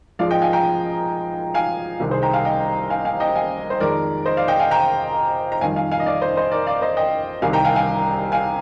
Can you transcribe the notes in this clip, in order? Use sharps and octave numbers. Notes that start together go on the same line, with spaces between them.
G#2 F3 G#3 D5 F5
D#5 G5
F5 G#5
G5 A#5
F5 G#5
C2 C3 D#3
G#4 C5
G5 A#5
F5 G#5
D#5 G5
F5 G#5
F5 G#5
D#5 G5
F5 G#5
C5
F2 D#3 G#3 A#4 D5
C5 D#5
D5 F5
D#5 G5
F5 G#5
G5 A#5
A#5
F2 D#3 G3 F5 G#5
F5 G#5
F5 G#5
D#5
D5 F5
C5 D#5
C5 D#5
A#4 D5
D5 F5
C5 D#5
D#5 G5
C2 C3 D#3 F5 G#5
G5 A#5
F5 G#5
F5 G#5
F5 G#5